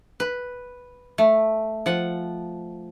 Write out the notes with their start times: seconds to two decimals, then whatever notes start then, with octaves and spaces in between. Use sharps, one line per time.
0.20 B4
1.18 A3
1.86 F3 F#5